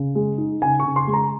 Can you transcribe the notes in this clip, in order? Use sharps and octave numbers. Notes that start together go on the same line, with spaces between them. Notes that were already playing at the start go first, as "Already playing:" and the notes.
Already playing: C#3
G#3
D#4
C#3 G#5
C#6
C#3
C6
G#3
A#5